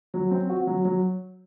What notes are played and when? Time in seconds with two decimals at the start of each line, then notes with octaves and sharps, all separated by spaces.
0.14 F#3
0.31 C4
0.49 F#4
0.67 F#3
0.85 F#3